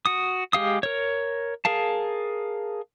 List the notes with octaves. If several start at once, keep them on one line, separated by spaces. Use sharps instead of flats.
F#4 D#6
G#3 G4 F5 D#6
A#4 C#5
G#4 A#4 F5 A5